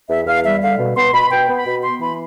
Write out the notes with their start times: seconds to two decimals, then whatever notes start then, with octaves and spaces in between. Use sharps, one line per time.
0.09 E2 E5
0.27 E2 F5
0.44 G3 E5
0.62 D3 F5
0.79 B2
0.97 B3 C6
1.13 B2 B5
1.31 B2 G5
1.49 B3
1.57 B5
1.66 B2
1.83 B3 C6
2.01 E3 B5